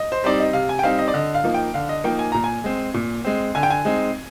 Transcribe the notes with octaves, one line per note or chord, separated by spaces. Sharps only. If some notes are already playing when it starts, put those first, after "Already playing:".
Already playing: D#5
C5
G3 C4 D#4 D5
D#5
C3 F5
G#5
G5
G3 C4 D#4 F5
D#5
D5
D3 D#5
F5
F3 A#3 D#4
G5
D3 F5
D#5
F3 A#3 D#4 G5
G#5
A#2 A#5
G#5
G#3 C4
A#2
G#3 C4
D3 G#5
G5
G#5
G#3 C4 D#4